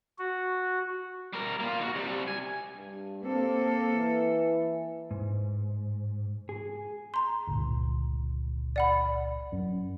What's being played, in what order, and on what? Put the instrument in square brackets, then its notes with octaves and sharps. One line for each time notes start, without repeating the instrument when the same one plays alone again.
[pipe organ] F#4
[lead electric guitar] G3 A#4
A#3 F4
D#4 F#4
C3 G3
G#5
[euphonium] G2
[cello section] A#3 A4 [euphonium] C4
[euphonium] E3
[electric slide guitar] G#2
G#4
[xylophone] A#5 C6
[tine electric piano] G1 C#2 A#2
[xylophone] D5 F#5 B5
[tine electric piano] F#2